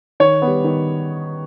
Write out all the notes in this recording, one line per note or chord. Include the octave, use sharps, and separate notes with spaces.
D#3 C#5
B3
G3
D#3